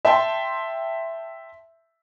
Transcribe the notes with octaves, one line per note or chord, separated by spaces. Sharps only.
E5 G5 A5 C6